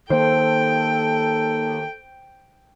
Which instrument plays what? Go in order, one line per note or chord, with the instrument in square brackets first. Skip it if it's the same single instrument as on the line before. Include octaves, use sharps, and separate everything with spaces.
[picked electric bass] D#3 A#3 [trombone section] A4 [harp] C5 [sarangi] G5